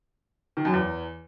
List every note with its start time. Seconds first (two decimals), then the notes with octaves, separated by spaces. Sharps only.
0.57 D#3
0.65 F#2
0.73 E2